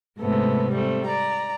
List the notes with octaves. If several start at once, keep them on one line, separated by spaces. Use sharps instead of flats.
G#2 C3 A3 B3 C4
G3 A3 C4
D5 A#5